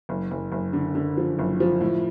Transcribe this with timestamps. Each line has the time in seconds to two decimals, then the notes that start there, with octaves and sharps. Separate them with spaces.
0.09 F#1
0.31 F#1
0.52 F#1
0.73 D3
0.95 D3
1.17 F3
1.39 F#1
1.60 F3
1.81 A2